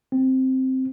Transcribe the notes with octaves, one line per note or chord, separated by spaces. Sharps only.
C4